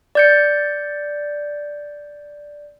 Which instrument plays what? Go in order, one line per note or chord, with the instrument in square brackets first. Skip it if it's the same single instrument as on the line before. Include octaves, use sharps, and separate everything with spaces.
[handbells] D5 G6 C#7